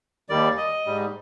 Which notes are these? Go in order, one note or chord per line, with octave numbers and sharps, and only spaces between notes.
D#2 D#3 G3 D5
D#5
G#2 G3